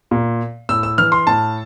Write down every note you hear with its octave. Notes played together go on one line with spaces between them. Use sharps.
A#2
A2 E6
E6
E3 F6
C6
A2 A5